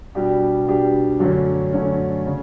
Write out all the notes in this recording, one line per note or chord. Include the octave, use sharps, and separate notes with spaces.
B2 G3 D4 G4
B2 G3 D4 G4
F#2 D3 F#3 A3 C#4
F#2 D3 F#3 A3 C#4
C#3